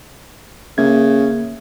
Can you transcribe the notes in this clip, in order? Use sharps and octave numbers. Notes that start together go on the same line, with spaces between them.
C#3 A#3 E5 G#6